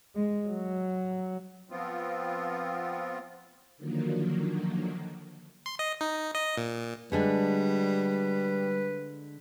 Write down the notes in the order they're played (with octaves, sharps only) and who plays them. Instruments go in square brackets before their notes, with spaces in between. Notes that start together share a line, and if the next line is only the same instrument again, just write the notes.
[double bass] G#3
F#3
[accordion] F3 B3 C4 F4
[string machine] D3 D#3 F3 F#3 A#3
[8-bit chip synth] C6
D#5
D#4
D#5
A#2
[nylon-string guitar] D3 G#3 D4 [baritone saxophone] G3 [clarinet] B4